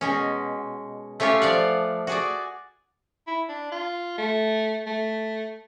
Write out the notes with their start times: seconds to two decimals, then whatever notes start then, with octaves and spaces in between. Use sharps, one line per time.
0.01 B2 G#3 C#4
1.20 A3 C#4 F4 G4 C#5
1.42 F3 D5 F5 F#5
2.07 F#4 G#4 D5
3.27 E4
3.49 D4
3.72 F4
4.18 A3
4.87 A3